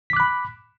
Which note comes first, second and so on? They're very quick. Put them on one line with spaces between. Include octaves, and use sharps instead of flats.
B6 D6 F#6 B5